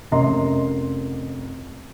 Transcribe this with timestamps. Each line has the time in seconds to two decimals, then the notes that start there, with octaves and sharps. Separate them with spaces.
0.11 F1 C#4 A#4 D#5 A#5 C6